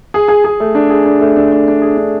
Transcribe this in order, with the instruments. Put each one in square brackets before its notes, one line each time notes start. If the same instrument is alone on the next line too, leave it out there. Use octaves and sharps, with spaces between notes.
[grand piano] G#4
G#4
G#4
A3
D4
G#4
D4
A3
D4
A3
D4
G#4
D4